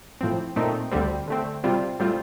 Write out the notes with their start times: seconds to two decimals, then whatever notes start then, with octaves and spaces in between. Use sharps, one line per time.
0.21 A2 F3 C4
0.56 A#2 A3 C4 D#4
0.92 D2 D3 G3 C4
1.28 D3 A3 C4
1.64 C3 G3 C4 F4
2.00 A2 G3 C4 F4